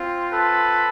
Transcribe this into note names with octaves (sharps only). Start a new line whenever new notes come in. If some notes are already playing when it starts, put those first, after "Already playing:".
Already playing: C4 F4
A4 B4